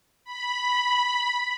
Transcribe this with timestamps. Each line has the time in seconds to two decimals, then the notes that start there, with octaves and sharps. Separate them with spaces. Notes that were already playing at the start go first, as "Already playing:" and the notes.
0.24 B5